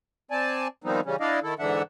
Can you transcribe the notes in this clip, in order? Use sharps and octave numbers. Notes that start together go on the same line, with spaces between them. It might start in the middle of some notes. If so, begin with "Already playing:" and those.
C4 D5 G#5 A5
D#3 F3 G3 B3 C4 D#4
C#3 E3 G3 C#4
D4 E4 D5 D#5 F5
D#3 E4 A4
G#2 D3 E3 D4 E5 F#5